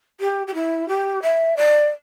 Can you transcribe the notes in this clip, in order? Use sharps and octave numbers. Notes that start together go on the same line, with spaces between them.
G4
G4
E4
G4
E5
D5